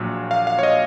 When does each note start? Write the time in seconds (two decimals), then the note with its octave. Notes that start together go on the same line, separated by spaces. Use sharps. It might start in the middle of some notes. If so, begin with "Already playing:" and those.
Already playing: A#1 A#2 F#3
0.31 F5
0.47 F5
0.59 C#5
0.63 D#5